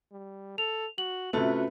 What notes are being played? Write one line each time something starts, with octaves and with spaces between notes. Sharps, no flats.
G3
A4 F7
F#4 F#7
C3 A3 C#4 F4 F#4 B4